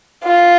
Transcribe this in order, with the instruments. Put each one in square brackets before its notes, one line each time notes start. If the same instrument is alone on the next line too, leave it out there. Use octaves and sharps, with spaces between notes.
[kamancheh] F4